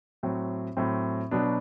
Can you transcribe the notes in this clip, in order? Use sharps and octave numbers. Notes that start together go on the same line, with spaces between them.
A2 F#3 C4
A2 F#3 C4
B2 F#3 B3 D4